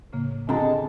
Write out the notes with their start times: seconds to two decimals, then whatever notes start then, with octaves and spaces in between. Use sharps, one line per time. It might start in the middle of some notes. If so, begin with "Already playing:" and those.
0.13 A2 C#3 A#3
0.49 D3 C4 F4 G4 G#4 D#5 A5 A#5